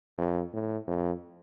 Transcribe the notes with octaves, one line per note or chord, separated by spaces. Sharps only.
F2
A2
F2